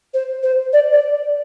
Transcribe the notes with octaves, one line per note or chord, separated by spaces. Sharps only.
C5
C5
D5
D5